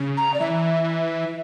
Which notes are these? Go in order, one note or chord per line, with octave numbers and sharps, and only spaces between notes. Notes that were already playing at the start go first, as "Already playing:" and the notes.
Already playing: C#3
A#5
D5
E3 E5